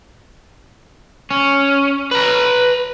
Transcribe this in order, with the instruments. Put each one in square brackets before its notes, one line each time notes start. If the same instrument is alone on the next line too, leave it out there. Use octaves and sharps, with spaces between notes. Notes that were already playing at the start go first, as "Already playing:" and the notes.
[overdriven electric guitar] C#4
B4 A#5